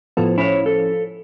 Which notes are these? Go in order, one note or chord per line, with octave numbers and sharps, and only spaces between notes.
A2 F3 B3 F4 A4
C#4 E4 C#5
A4